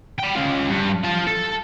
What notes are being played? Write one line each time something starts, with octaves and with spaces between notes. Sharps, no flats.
G5 B5
C#4 F4
G2
F4 A5
A4